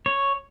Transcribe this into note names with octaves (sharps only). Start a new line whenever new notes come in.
C#5